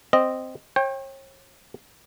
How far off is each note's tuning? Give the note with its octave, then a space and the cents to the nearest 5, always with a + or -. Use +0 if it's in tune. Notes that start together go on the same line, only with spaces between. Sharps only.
C4 -5 D#5 -10
C#5 -40 G5 +15